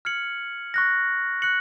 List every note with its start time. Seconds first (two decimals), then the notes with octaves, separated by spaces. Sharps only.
0.05 F6 G#6 C#7 F#7
0.74 C#6 F#6 A#6
1.42 F#6 C#7 F#7